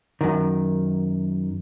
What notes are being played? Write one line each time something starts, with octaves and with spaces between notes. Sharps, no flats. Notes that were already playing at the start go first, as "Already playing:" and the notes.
F#2 D#3